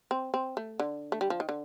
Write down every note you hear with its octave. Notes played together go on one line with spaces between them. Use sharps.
C4
C4
A3
D3
A3
G3
F3
D#3
D3